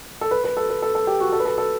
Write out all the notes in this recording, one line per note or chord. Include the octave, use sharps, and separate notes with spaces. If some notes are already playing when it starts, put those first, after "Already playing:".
A4
B4
B4
A4
B4
A4
A4
G4
F#4
A4
B4
A4
A4